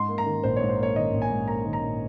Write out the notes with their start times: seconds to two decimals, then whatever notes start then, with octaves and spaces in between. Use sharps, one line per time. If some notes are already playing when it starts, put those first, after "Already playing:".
Already playing: G#2 C6
0.09 A#3
0.18 A#5
0.26 D#3
0.44 A#1 C5
0.56 C#5
0.61 G#2
0.69 C5
0.79 A#3 C#5
0.96 D#3 D#5
1.14 A#1
1.22 G#5
1.30 G#2
1.48 A#3 A#5
1.65 D#3
1.73 A#5
1.82 A#1